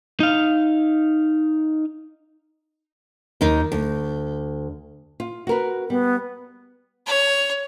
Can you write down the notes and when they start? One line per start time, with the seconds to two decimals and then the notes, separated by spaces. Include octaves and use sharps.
0.20 D#4 F5
3.41 D#2 D#4
3.72 D2
5.20 F4
5.47 F#4 A#4 B4
5.90 G3 B3
7.06 C#5